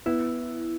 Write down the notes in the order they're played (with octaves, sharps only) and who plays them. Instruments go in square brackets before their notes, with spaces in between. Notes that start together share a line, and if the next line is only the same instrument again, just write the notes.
[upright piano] B3 [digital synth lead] E4